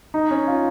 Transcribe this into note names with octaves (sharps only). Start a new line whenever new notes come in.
D#4
C#4
F4